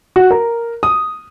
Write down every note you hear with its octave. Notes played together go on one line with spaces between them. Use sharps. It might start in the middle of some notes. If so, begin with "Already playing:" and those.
F#4
A#4
D#6